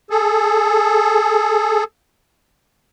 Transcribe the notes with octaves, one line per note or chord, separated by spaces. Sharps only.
G#4 A4